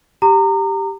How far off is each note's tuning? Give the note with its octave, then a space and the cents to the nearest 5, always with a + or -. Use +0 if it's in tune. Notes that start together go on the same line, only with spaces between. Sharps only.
G4 +0 A#5 -25 D6 +40